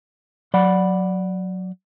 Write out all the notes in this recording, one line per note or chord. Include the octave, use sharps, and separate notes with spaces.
F#3 D5 F#5 B5